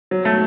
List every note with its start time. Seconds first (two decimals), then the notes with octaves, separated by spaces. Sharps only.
0.11 F#3
0.25 A3